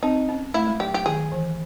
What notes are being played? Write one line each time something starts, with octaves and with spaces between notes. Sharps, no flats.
C4 D#4
C#4
A3 E4
G#3
F#3 G4
G4
D#3 G#4
E3